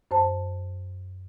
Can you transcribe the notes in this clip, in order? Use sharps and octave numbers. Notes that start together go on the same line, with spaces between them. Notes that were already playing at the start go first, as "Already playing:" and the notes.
F#2 C5 A5